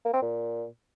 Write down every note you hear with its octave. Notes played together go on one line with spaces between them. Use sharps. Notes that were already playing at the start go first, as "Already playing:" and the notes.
A#3
C4
A#2